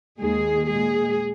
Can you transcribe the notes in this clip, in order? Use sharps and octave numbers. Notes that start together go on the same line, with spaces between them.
D#2 D#3 G#3 G#4
A#2 G#3 G#4